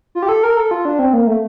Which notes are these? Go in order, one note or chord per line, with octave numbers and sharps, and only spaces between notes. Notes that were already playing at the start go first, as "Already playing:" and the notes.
F4
G4
A4
A#4
A4
F4
D4
C4
A#3
A3